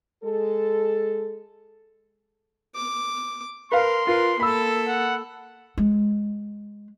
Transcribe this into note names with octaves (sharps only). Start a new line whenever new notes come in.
G#3 A4
D6
A#4 B4 F5 C6
F4 A#4 B4
A#3 A4 B5 E6
F#5
G#3